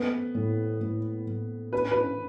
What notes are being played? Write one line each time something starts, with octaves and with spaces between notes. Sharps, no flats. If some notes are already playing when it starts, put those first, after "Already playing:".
Already playing: A3 B3
A2
A2
A2
D4 B4
B4